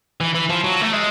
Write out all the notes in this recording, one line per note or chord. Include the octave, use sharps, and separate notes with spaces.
E3
E3
F3
F#3
A3
G#3